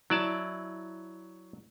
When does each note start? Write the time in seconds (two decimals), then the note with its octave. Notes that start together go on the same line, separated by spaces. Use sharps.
0.10 F#3 E4 D5 A5